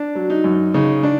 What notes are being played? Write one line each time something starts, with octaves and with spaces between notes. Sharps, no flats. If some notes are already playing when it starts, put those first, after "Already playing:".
Already playing: D4
F#3
D#4
F#2
C#3 D#4
D4